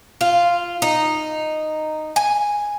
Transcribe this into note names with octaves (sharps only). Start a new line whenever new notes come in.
F4
D#4
G#5